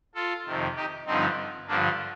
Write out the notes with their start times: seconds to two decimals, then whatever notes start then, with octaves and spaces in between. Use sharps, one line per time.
0.15 F4 A4
0.46 F2 C3 D#3
0.76 D#4 G4
1.06 G2 D3 F3 C4 D#4
1.67 G2 D3 F3 A#3 D4